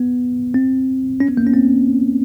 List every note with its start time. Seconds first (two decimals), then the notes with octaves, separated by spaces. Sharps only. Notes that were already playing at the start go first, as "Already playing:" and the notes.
Already playing: B3
0.54 C4
1.20 C#4
1.29 B3
1.37 A#3
1.47 C#4
1.54 C4